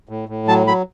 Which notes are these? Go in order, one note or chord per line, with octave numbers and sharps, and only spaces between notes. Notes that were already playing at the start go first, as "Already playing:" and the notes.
A2
A2
F#3 A5
F#3 B5